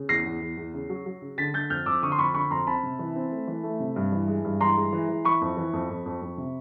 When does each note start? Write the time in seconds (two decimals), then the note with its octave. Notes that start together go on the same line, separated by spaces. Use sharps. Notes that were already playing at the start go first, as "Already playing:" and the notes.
Already playing: C#3
0.09 E2 A#6 C7
0.26 E2
0.42 E2
0.57 E2
0.74 C#3
0.90 F#3
1.06 F#3
1.22 C#3
1.38 D3 A6 B6
1.54 D3 G6 A6
1.70 F2 F6 G6
1.86 F2 D6 E6
2.02 D3 C#6 D#6
2.12 C6
2.18 F2 B5 C#6
2.34 D3 B5 C#6
2.50 F2 A#5 C6
2.67 C4 A5 B5
2.83 C3
2.99 E3
3.16 C4
3.32 A3
3.47 E3
3.64 A3
3.80 C3
3.96 G2
4.12 E3
4.28 G#3
4.44 G2
4.60 E3 A#5 C6
4.77 G#3
4.93 E3
5.09 E3
5.25 E3 B5 C#6
5.41 F2
5.57 E3
5.73 F2
5.90 F2
6.06 F2
6.22 F2
6.38 C3